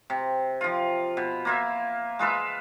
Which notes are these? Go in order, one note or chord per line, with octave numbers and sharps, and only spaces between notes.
C3
F3 F4
B2
A#3 F4 E5
G#3 F4 B4 E5